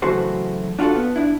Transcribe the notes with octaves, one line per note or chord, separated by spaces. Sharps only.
C#3 E3 F#3 A3 F#4 C5
D4 F4 F#4 G#4 A4
B3
D4 E4